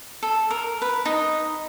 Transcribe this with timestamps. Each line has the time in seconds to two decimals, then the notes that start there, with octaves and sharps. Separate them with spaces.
0.22 A4
0.51 A#4
0.82 B4
1.05 D#4